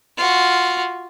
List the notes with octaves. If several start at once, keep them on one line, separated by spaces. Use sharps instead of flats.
F4 F#4